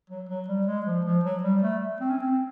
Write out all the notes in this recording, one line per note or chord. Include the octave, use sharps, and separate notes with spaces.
F#3
F#3
G3
G#3
F3
F3
F#3
G3
A3
C4
C#4
C4